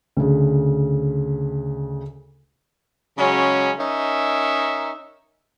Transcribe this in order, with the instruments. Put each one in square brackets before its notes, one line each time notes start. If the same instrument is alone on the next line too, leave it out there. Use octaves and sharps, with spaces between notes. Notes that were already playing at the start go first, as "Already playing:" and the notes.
[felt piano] D2 C#3
[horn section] C#3 F#3 G#3 C#4
C#4 D#4 A#4 E5